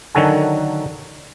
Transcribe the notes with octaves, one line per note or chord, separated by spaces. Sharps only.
D3 D#3 F#3 F#4 A4 G#5